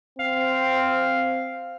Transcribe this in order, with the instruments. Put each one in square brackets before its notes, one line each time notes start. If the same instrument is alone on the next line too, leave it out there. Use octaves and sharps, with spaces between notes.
[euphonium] C4 [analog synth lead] F5